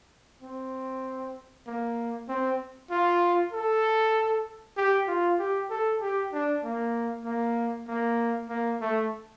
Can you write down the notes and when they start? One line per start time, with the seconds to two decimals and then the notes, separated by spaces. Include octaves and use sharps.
0.42 C4
1.67 A#3
2.29 C4
2.91 F4
3.53 A4
4.77 G4
5.08 F4
5.39 G4
5.70 A4
6.01 G4
6.33 D4
6.64 A#3
7.25 A#3
7.88 A#3
8.49 A#3
8.81 A3